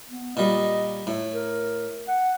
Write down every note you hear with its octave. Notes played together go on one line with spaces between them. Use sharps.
B3
A#2 G3 D#5
A2
A#4
F#5